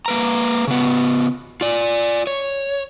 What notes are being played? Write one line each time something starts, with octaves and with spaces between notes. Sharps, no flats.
A#3 B4 A#5
C#3 B3
F4 D5
C#5